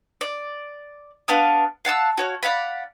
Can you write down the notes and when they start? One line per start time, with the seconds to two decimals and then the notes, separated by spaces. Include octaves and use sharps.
0.21 D5
1.28 B3 D4 F5 D#6
1.85 F5 F#5 A5 E6
2.17 F#4 C#5 F5
2.43 D5 F5 F#5 B5